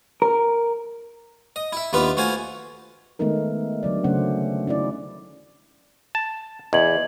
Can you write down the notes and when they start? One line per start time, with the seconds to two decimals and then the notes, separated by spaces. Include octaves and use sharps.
0.22 A#4
1.56 D#5
1.73 E4 E5
1.93 D#2 B3 D4 F4 B4
2.17 A3 F4 F#4 C5 G#5
3.19 D#3 G#3 A3 B3 D#4 A#4
3.83 D3 F#3 D5
4.04 C#3 F#3 A3 C#4 C5 F#5
4.67 C#4 D#4 E4 D5
6.15 A5
6.73 E2 D#5 G#6 F#7